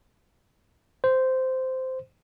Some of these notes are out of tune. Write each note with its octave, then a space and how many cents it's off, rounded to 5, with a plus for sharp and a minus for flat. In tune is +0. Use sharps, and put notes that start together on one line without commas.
C5 -10